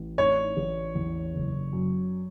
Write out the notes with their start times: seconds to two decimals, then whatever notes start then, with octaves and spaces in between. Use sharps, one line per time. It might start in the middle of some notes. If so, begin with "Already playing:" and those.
Already playing: A1
0.18 A2 C#5
0.57 A1
0.95 E2
1.34 F#1
1.73 F#2